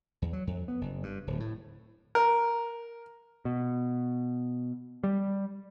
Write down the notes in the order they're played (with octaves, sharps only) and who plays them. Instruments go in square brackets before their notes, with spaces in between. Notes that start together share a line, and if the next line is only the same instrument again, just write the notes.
[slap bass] E2
F#3
F2
B3
F#1
G2
D1
A2
[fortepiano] A#4
[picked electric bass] B2
G3